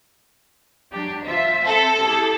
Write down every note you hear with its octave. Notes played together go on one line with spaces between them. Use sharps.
F#3 D4 G4
F4 C5 E5
C4 A4
E4 G4 G#4